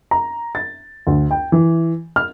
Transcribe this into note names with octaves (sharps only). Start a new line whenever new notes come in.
A#5
A6
D2
G5
E3
F6